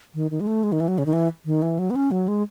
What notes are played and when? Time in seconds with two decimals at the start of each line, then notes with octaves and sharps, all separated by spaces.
0.14 D#3
0.31 D#3
0.41 G#3
0.47 A3
0.63 G#3
0.72 D#3
0.80 E3
0.88 F#3
0.98 C#3
1.06 D#3
1.13 E3
1.45 D#3
1.62 E3
1.79 F#3
1.90 B3
1.96 C#4
2.11 F#3
2.28 G#3